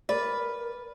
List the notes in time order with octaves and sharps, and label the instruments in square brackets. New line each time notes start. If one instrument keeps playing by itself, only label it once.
[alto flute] A#4 [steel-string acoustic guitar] B4 [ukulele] D5